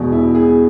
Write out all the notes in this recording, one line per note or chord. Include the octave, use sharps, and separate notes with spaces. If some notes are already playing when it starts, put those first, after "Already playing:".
Already playing: E1 E2 B2
E4
G#4